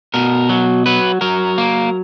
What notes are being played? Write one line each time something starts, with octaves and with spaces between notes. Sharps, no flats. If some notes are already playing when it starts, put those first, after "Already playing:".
B2 A#4
F#3
F#3 B4
F#3 A#4
A#3